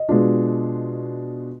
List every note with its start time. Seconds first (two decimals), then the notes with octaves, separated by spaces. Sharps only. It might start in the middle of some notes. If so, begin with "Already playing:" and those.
Already playing: D#5
0.08 B2 G#3 B3 D4 F4